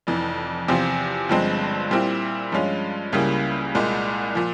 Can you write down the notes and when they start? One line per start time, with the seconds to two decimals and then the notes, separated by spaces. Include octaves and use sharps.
0.07 F1 F2 E3
0.68 E2 C3 F3 C4 F4
1.29 G1 G2 F3 G#3 C4
1.91 A#2 G3 C4 E4
2.52 G2 F3 G#3 C#4 F4
3.12 C#2 C#3 G3 A#3 E4
3.75 C2 A#2 G#3
4.35 A#2 F3